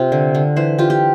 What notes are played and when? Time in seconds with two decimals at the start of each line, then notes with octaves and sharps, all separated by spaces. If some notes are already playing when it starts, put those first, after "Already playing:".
Already playing: C3 F4
0.12 D3
0.35 D3
0.56 E3 C5
0.78 F4 G4
0.90 G4